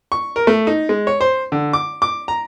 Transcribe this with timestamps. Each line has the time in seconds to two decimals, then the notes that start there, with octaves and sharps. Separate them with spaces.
0.12 C#6
0.36 A#4
0.47 A3
0.67 D#4
0.89 G#3
1.07 C#5
1.21 C5
1.52 D3
1.73 D6
2.02 D6
2.28 A#5